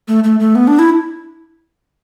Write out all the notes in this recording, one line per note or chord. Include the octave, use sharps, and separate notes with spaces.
A3
A3
A3
B3
D4
E4